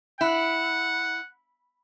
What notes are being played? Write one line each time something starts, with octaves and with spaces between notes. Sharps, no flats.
E4 F#5